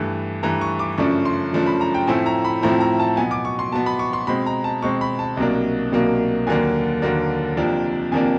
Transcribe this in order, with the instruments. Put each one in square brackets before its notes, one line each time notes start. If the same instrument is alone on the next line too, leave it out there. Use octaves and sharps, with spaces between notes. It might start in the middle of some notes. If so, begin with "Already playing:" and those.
Already playing: [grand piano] G2 E3 A3
G2 E3 A3 A#5
C#6
D6
F#2 C#3 F3 A3 D4 C#6
C6
F#2 C#3 F3 A3 D4
B5
A#5
G5
A2 F3 A3 C4 E4 G#5
A#5
B5
A2 F3 A3 C4 E4 A#5
A#5
A5
B2 F#3 B3 G#5
D6
C#6
C6
B2 F#3 B3 A5
B5
C#6
C6
B2 G#3 C4 B5
A#5
A5
B2 G#3 C4 C#6
B5
A5
C2 B2 F#3 A#3 D4
C2 B2 F#3 A#3 D4
D#2 D3 F#3 A#3 D4 G#5
D#2 D3 F#3 A#3 D4
F2 C3 F3 A#3 D4
F2 C3 F3 A#3 D4 G#5